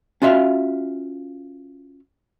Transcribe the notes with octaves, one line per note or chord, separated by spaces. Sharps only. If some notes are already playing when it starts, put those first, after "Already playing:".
C#4 F4 F#4 E5 F5